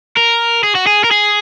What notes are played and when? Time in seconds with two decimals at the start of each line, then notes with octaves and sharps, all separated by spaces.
0.17 A#4
0.63 G#4
0.75 F#4
0.87 G#4
1.04 A#4
1.11 G#4